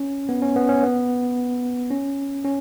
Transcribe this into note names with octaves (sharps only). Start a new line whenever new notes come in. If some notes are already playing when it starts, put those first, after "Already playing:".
Already playing: C#4
B3
C#4
B3
C#4
B3
C#4
C#4